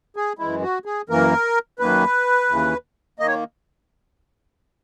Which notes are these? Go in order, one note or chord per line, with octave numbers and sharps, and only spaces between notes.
G#4
F#2 E3 G#3 E4
F#4
G#4
F#2 E3 A#3 A#4
F#2 D#3 A#3 B4
D#2 C#3 E3
D#3 A#3 D#5
C#5